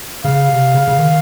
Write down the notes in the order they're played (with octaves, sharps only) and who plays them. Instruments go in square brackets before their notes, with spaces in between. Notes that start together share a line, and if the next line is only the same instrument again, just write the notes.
[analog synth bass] C#3 [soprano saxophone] F5
[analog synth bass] C3
C#3
C#3
D#3